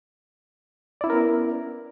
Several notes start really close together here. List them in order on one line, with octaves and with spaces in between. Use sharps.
D5 E4 C#4 A#4 B3